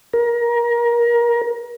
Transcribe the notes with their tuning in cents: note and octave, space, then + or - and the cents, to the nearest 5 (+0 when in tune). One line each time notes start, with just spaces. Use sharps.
A#4 +25